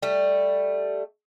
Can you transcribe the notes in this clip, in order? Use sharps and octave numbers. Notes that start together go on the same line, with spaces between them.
G3 A3